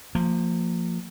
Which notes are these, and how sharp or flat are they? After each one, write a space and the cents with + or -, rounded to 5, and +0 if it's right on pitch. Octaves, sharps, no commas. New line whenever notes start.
F3 +0 A#3 -30